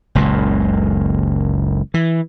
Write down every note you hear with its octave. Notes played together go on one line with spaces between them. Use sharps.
F#1 C#2 F#2 A#2
E3